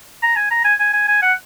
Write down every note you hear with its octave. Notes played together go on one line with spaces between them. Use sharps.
A#5
G#5
A#5
G#5
G#5
G#5
G#5
F#5